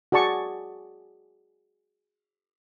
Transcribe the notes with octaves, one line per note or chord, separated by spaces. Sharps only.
F#4 G#4 D5 A5 C#6